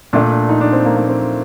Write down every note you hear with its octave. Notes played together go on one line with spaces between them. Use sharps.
A#2 A3 D4
D4
D#4
D4
C4
A#3
A#3
C4